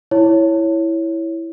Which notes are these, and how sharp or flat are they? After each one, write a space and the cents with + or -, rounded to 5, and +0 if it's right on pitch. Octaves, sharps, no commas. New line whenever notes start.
E4 +0 C#5 +0